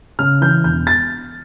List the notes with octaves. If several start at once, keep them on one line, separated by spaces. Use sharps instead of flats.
C#3 F6
E3 G6
E1 G6
A6